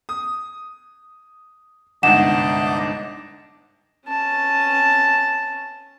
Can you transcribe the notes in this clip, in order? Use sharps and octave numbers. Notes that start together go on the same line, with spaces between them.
D#6
G1 C2 G#2 D#5 F#5 A5 D6 E7
C#4 A5